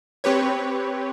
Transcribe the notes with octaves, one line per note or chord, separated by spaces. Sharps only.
C4 G4 B4 C#5